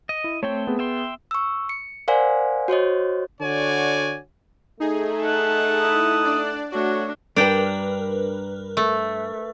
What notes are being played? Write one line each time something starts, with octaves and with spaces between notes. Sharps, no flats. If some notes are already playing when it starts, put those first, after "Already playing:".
D#5
E4
A3 C4 C#5 G5
B3 G#4
E5 G5 C6
C#6 E6
C#7
A#4 C5 D5 F5 F#5 G#5
F#4 C5 C#5 D#5
D3 F#4 C#5 D5 G#5
A3 D#4 G#4
F#5 A5
D#4 E4 D#6
D4 D5
A3 D4 F#4 C#5
G2 D4 G4 A#4 B4 G5
A3